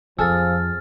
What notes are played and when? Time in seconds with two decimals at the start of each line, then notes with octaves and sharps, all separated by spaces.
0.19 F2 F3 G#4 A4 E6 F6 A6